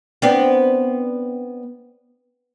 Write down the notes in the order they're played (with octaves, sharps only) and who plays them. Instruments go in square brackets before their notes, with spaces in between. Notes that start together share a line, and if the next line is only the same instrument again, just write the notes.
[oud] B3 C4 D4